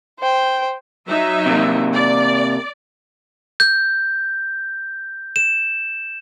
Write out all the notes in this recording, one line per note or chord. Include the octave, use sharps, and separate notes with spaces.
C5 G5
F#3 D#4 E5
C3 A#3
D5
G6
E7